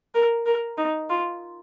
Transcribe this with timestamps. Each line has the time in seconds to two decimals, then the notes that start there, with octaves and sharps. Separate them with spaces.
0.15 A#4
0.46 A#4
0.78 D#4
1.10 F4